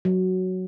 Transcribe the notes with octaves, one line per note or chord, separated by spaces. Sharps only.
F#3